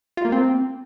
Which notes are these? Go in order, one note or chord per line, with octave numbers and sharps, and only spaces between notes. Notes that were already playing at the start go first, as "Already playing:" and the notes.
F4
A#3
C4